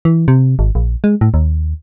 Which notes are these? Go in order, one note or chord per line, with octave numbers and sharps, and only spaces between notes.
E3
C3
G#1
A#1
G#3
A2
D#2